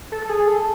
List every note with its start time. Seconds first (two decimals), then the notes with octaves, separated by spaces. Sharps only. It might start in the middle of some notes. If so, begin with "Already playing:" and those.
0.12 A4
0.22 A4
0.29 G#4
0.48 A4